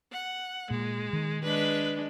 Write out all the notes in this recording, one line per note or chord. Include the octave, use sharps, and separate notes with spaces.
F#5
A#2 G#3
D#3
G#3 D4 B4